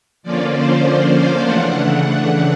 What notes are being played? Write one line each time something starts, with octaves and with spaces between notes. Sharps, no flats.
D3 F3 A#3 C#4 F4 D5
C5
C5
F5
C#3 E3 A3 D4 F#5
F#5
F#5